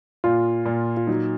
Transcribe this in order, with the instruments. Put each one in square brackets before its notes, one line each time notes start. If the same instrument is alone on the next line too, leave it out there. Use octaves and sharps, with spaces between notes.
[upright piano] A#2 [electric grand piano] F4
[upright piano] A#2
[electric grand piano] F4
[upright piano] F#3 [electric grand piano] D#4